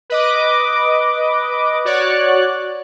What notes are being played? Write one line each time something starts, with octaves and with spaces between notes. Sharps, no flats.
B4 D#5 D6
F#4 C#5 D5 F#6